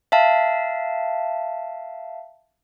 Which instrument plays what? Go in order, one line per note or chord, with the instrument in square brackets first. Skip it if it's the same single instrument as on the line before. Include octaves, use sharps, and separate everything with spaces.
[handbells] E5 F5 A5